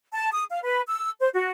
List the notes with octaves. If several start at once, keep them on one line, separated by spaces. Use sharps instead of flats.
A5
D#6
F5
B4
E6
C5
F#4